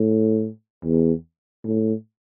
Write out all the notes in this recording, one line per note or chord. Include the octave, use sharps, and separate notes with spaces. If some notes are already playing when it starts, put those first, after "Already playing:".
Already playing: A2
E2
A2